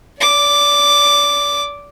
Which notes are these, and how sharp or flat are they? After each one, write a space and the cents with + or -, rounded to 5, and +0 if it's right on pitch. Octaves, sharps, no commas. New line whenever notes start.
D5 -30 D6 +0